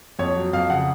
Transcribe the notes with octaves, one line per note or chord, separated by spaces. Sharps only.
F2 C#5
F#3
F2 F5
C#3 F#5